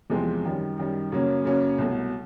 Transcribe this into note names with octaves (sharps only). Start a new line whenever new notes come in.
E2 C3 F3 G#3 C4
F#2 D#3 G3
F#2 D#3 G3
F#2 C#3 F#3 A#3 C#4
F#2 C#3 F#3 A#3 C#4
C2 B2 F#3 A3